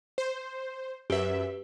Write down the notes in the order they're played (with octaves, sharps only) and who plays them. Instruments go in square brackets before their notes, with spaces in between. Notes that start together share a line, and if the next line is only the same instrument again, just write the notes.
[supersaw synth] C5
[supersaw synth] F#2 E5 [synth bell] G4 B4